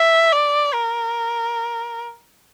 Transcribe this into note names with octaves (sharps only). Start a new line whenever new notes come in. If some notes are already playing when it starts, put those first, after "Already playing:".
Already playing: E5
D5
A#4